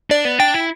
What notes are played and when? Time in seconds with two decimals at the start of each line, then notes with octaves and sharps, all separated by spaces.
0.10 D4 D5
0.25 B3
0.39 D4 G5
0.54 E4